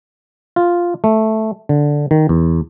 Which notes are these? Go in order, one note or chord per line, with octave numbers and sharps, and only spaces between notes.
F4
A3
D3
D#3
E2